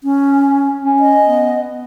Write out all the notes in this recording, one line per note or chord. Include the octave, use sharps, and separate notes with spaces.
C#4
C#4
D#5
B3